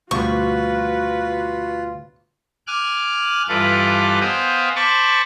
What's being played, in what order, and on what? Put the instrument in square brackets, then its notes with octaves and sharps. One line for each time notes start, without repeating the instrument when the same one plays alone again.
[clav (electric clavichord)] D2 B2 G3 [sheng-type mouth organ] F4 [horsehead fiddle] F#4 B4 [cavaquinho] C#6
[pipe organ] G#5 D6 F6 F#6
G2 E3 F4 A4 B4 D6
B3 C5 D#5 F5 G5 G#5
C5 A5 B5 C#6 D6